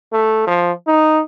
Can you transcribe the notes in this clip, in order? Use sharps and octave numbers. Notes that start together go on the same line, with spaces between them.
A3
F3
D#4